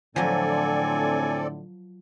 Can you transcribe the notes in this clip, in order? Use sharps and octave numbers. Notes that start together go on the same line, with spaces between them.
A2 D3 F3 F#3 C4 A4 D5 G#5